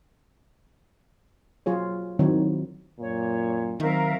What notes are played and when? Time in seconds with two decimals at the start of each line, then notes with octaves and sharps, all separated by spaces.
1.66 F#3 F4 G#4 C#5
2.19 D#3 F#3 C4 D#4 E4 C#5
3.00 F#2 A#2 C#5
3.80 D#3 F#3 C4 A#4 E5 F5